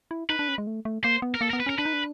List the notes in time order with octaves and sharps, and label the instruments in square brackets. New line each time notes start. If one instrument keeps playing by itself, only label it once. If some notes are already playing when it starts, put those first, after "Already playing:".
[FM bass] E4
[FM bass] D#4 [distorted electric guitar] B4
[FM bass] D4
C#4
G#3
A3
A3
[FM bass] A#3 [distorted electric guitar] C5
[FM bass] B3
[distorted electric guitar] A#4
[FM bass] A#3 [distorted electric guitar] A4
[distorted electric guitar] A#4
[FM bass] B3
[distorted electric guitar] B4
[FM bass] C#4 [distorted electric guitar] A#4
[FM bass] D4 [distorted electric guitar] B4
[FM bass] D#4
D4